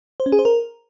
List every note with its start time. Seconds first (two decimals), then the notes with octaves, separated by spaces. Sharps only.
0.20 C5
0.26 C#4
0.32 G#4
0.39 C5
0.45 A#4